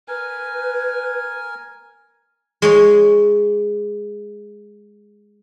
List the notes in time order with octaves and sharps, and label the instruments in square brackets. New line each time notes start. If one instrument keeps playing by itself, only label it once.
[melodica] A#4 G#5 [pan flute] B4
[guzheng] G#3 G#4 C#5